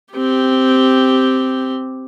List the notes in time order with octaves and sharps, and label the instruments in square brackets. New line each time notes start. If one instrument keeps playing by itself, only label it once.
[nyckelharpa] C4 G4